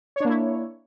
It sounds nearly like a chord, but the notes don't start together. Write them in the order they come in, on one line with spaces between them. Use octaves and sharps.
C#5 D4 A#3 E4